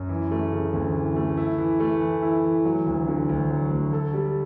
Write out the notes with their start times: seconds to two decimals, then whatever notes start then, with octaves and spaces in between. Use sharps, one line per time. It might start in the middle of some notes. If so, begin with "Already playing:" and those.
Already playing: F#2
0.09 E3
0.31 A3
0.52 C#3
0.73 D2
0.94 E3
1.16 A3
1.37 E4
1.58 E3
1.80 A3
2.01 E3
2.22 E4
2.44 E3
2.65 F#3
2.86 D2
3.07 D3
3.29 D2
3.50 F#3
3.71 D2
3.93 A4
4.13 G3